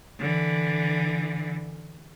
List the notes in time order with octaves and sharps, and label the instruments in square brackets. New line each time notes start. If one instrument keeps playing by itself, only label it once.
[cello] D3 E3